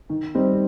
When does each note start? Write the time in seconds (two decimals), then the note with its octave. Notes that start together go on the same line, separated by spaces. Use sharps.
0.09 D#3
0.35 G3 C4 D#4